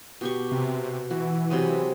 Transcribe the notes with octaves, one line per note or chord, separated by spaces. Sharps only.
B2 G4 C#6
C3
E3 F#4
C3 F#3 G#3